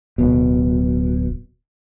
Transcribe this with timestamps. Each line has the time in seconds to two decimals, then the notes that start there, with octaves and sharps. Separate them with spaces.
0.18 D1 B2